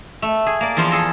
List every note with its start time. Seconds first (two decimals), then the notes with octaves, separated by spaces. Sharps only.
0.22 A3
0.46 G#4
0.61 A#3 D5
0.77 E2 F3 F4 C5 F5
0.91 G#4 A4 A#5